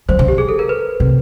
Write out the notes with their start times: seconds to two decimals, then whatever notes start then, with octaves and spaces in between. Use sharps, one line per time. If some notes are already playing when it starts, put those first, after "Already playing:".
0.09 G3 C5
0.19 C#3
0.28 G4
0.38 G#4
0.49 A4
0.59 A#4
0.69 B4
1.00 C3